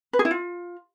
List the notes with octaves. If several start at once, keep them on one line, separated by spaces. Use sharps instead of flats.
B4
G#4
E4
F4